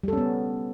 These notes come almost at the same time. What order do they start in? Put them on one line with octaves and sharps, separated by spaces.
G3 A4 C#4 B3